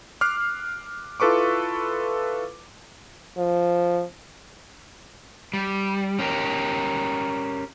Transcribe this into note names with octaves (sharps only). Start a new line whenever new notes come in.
D6 F6 F#6 C7
E4 F4 A4 B4 C#6 D6
F3
G3
C#4 G4 A#4